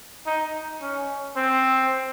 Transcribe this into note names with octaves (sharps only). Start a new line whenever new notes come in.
D#4
C#4
C4